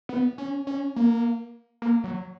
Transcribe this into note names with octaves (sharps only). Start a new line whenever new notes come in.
B3
C#4
C#4
A#3
A#3
F#3